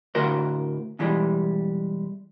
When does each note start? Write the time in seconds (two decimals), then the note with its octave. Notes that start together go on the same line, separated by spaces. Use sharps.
0.15 A2 D3 F#4 A#4 C5
0.99 B2 E3 G3 G#3